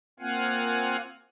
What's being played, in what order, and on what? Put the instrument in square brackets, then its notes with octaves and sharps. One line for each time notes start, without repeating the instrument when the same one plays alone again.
[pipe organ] A#3 C4 F4 F5 F#5 G#5